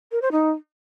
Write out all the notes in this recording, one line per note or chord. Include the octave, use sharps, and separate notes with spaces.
A#4
C5
D#4